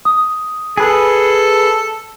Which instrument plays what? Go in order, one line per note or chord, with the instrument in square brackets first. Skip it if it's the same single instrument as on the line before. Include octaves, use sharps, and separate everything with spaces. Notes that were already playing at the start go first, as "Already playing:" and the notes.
[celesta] D#6
[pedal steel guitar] G#4 B4 [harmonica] A4